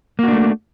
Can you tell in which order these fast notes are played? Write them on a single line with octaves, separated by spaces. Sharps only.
A#3 F#4 D4 A3